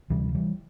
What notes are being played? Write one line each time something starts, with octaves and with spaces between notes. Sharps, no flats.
D2 C3 E3 G3
F3
E3 G3